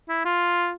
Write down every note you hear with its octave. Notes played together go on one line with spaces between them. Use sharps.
E4
F4